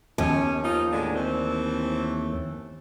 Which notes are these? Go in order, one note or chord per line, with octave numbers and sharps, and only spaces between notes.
D#2 C#4
F3 D#4 F4
A2 D3 G#3
E3 A3 C4